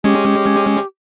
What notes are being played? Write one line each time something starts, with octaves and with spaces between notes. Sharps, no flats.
G#3 C#4 G4